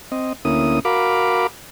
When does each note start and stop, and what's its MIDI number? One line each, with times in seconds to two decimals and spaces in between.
0.12 0.33 60
0.12 0.33 75
0.45 0.79 38
0.45 0.79 58
0.45 0.79 61
0.45 0.79 64
0.45 0.79 87
0.85 1.47 66
0.85 1.47 70
0.85 1.47 77
0.85 1.47 83
0.85 1.47 86